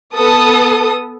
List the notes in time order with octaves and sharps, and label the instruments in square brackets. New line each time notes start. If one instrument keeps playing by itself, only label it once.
[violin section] B3 A4 D#6